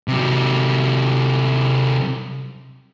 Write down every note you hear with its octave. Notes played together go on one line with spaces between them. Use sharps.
C3 F#3